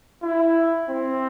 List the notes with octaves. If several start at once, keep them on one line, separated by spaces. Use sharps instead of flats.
E4
C4